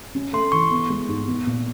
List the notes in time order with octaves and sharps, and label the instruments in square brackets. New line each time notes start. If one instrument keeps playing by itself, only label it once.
[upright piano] C#4
[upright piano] A3 [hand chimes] C6
[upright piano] E3 [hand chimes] C#6
[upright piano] B3
G#3
G#2
B3
A#2